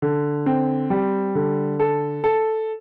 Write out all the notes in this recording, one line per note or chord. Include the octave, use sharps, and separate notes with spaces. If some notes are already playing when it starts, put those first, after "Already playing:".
D3
C4
G3
D3
A4
A4